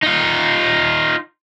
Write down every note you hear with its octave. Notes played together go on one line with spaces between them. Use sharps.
D#4 F4